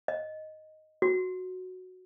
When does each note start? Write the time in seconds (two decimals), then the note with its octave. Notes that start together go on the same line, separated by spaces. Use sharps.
0.08 D#5
1.02 F#4